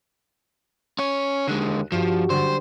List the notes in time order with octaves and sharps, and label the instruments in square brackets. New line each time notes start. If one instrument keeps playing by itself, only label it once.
[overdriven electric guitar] C#4 C#5
[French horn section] D#2 [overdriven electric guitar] D3 G#3 [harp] F#6
[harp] G2 [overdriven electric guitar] F3 [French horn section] F#4 G4
[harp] D3 F#3 G3 [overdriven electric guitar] C5